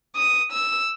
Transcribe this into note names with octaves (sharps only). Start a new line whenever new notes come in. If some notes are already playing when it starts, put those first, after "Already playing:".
D#6
E6